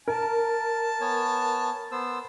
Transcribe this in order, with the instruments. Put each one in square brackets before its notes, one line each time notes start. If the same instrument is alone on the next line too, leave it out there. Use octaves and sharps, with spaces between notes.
[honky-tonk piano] A#4 [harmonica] A5
[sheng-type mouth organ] B3 C#5 G#5
B3 C5 E6